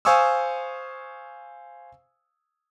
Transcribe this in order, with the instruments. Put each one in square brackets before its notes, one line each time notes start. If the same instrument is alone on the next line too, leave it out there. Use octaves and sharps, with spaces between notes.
[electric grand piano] C5 F5 G#5 C#6 D#6 E6